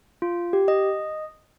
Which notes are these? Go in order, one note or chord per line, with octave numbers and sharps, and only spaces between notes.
F4
G4
D#5